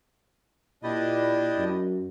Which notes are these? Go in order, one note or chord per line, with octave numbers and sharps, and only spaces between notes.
A#2 D4 E4 G4 D5 D#5
F#2